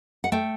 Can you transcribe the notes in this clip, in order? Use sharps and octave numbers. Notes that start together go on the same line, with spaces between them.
F#5
A3 G5